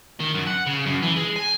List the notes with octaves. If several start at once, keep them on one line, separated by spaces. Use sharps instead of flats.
D#3
F#2
F#5
C#3
F#2
E3
G#3
G#5